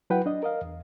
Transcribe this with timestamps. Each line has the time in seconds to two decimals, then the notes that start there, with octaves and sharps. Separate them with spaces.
0.10 F#3 E4 B4 F#5 G5
0.26 D4 D#5
0.43 A#4 D#5 F5
0.62 E2